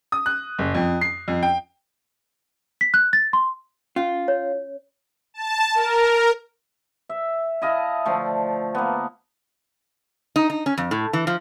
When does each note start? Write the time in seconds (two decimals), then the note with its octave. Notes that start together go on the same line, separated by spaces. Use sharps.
0.12 D#6
0.26 F#6
0.59 F#1
0.75 F2
1.01 C7
1.28 F2
1.43 G5
2.81 B6
2.94 F#6
3.13 A6
3.33 C6
3.96 C#4 F4
4.28 C#5
5.34 A5
5.75 A#4
7.09 E5
7.62 E4 D#5 F5 A5
8.05 D3 F3 A3
8.75 A#3 B3
10.36 D#4
10.50 D#4
10.66 C#4
10.78 F2
10.91 A2
11.13 E3
11.27 F3